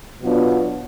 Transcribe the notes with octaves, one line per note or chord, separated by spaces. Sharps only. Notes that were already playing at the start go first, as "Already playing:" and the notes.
B2 F#3 B3 D4 F4